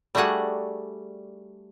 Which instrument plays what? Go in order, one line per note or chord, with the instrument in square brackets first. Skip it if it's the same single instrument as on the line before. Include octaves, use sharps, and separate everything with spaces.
[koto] G3 A3 D4 F#4 G#4 F#5